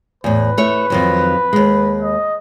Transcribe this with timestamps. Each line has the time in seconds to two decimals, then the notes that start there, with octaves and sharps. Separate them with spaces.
0.24 E2 A2 B4
0.58 A3 E4 C#5
0.90 F2 D#3 F#3
1.53 D#2 G#3
2.02 D#5